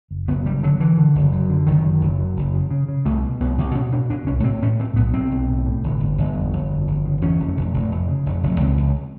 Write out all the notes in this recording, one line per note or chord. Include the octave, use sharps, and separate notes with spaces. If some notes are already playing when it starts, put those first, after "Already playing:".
F#1
F#1 B3
F#1 G3
D3 F#3
D3 E3
D3
F#1
F#2
D3
F#1 D#3
F#2
F#1
F#2
F#1
C#3
C#3
C#3
C2 A3
B2
C2 B3
C2
B2 C#4
B2 D4
B2 D4
C2 C#4
A2 C4
A2 C#4
A2 C4
B1 B3
B1 C4
B1
A2
A2
G1
G1
G1
F2
G1
F2
G1
C#3
E2 C#4
F1
F1
F1
F1
C#3
F1
F1
C#2 C4
C#2